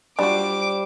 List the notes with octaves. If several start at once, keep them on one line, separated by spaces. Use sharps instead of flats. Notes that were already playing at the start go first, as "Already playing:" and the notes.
G3 D4 F4 F#4 C5 D6